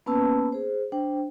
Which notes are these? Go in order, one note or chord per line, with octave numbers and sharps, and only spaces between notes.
A#3 B3 C#4 B4 A5 E6
G#4 C5
D4 C5 G5